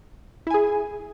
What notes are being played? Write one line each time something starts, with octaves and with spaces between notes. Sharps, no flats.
E4 G#4 G#5